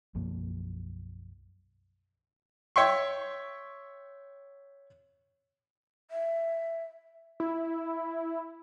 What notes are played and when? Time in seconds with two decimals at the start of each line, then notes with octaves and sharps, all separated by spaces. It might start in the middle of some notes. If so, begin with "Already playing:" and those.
0.15 B1 F#2 F3 A#3
2.76 C#5 E5 G5 C6 C#6
6.11 E5
7.40 E4